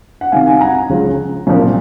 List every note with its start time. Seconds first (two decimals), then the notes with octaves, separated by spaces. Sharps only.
0.21 F#5
0.32 C2 C3 D#3 F5 G#5
0.46 F5 G#5
0.56 G#5
0.61 F#5 A#5
0.90 C#2 C#3 F3
1.47 C2 A#2 F3